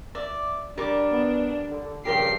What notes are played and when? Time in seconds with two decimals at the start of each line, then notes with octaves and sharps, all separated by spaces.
0.15 D5 E5
0.78 G3 D4 A#4 D6
1.11 B3
1.70 D3
2.05 A#1 G2 C#3 G4 A#4 G5 C7